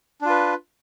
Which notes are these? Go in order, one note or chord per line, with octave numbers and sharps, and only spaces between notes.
D4 F4 B4